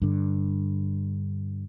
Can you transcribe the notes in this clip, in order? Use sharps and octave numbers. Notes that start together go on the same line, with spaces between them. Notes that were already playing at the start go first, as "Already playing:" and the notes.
G2 D3